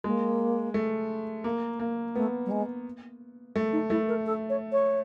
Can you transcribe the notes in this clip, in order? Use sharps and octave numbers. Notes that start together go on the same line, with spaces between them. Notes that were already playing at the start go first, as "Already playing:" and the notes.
G#3 A#3
A3
A#3
A#3
A3 B3
G3
G#3
A3
D#4
A3 E4
A#4
A4
C#5
C#5